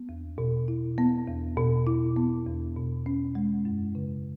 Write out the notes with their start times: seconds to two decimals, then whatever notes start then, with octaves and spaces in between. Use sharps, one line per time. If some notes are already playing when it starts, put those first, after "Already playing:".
Already playing: B3
0.09 E2
0.38 B2
0.68 E4
0.98 B3
1.28 E2
1.57 B2
1.87 E4
2.16 B3
2.46 E2
2.77 B2
3.06 C#4
3.35 G#3
3.65 F#2
3.95 C#3